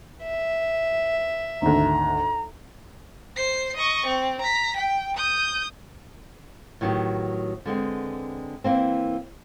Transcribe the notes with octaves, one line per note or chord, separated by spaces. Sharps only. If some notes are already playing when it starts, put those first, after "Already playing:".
E5
G#1 D2 A#5
C5 C7
D#5 C#6
C4
A#5 B6
G5
D#6 G6
A2 D#3 F#3 B3 G4
D3 G#3 B3 C4
E3 A#3 C4